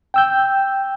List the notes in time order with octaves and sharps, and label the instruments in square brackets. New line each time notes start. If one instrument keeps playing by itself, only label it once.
[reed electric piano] G5 E6 G6